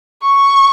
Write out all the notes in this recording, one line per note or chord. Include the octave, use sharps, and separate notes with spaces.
C#6